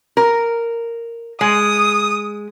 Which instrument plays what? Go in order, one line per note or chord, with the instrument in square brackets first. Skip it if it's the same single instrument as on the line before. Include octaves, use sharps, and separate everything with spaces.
[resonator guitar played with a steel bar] A#4
[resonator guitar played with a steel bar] G#3 [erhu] D#6